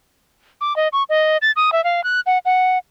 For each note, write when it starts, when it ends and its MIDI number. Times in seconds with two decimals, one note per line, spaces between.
0.61 0.76 86
0.76 0.88 75
0.93 1.03 85
1.09 1.37 75
1.42 1.51 93
1.56 1.70 87
1.72 1.83 76
1.84 2.03 77
2.04 2.20 90
2.26 2.38 78
2.45 2.78 78